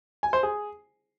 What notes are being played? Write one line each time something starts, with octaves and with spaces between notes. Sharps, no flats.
G#5
C5
G#4